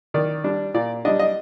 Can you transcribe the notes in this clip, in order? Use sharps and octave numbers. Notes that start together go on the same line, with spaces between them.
D#3 D5
G3 D4
A#2 D5
G3 D4 D#5
D#5